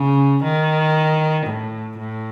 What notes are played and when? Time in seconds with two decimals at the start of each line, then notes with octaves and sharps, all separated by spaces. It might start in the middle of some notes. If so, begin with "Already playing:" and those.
Already playing: C#3
0.44 D#3
1.46 A2
1.98 A2